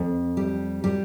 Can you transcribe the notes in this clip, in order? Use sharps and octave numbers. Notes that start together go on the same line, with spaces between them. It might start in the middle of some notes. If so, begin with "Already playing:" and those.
Already playing: F2
G3
G3